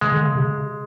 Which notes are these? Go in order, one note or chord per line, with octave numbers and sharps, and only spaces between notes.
C#3 G#3
D3
C#3
C3